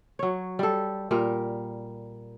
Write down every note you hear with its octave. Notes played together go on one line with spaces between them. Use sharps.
F#3 C#5
G3 A4
A#2 G3 A#4